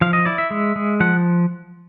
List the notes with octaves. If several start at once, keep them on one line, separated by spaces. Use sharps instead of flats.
F3 F5
D#5
E4 D5
E5
G#3
G#3
F3 F#5